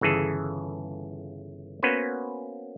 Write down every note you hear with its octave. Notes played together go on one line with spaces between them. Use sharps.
G1 C#3 E3 G#4 A4
A#3 B3 C#4 F#4 B4 C5